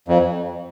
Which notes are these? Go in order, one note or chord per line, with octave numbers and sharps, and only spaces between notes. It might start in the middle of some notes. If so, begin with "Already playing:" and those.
F2